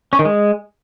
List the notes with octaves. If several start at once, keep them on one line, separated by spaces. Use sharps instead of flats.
C#4
D#3
G#3